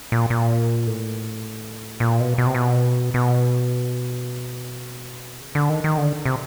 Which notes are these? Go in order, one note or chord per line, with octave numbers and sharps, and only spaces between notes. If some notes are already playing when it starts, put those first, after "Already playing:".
A#2
A#2
A2
A#2
B2
B2
C3
B2
B2
C#3
D3
D#3
D#3
D3
C3